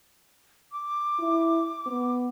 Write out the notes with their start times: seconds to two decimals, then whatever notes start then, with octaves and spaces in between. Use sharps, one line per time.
0.72 D6
1.20 E4
1.86 B3